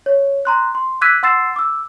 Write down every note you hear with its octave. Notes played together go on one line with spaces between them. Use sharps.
C#5
A#5 C6 F#6
C6
D6 E6 F#6 G#6 B6 D#7
F#5 C6 E6 A6 C7 E7
D6 E6